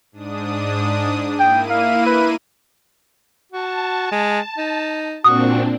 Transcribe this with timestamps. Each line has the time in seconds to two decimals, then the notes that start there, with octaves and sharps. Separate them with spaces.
0.12 G#2 D4 D#6
1.40 A#3 E4 G5 D#7
1.70 F5
2.07 B4
3.52 F#4 A5
4.12 G#3
4.57 D#4
5.24 A#2 C4 D4 F#4 D#6